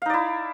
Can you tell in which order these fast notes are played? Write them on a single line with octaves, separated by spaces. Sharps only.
F5 D#4 D5 E4